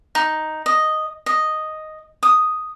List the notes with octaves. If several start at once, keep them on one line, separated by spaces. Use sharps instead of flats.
D#4
D#5
D#5
D#6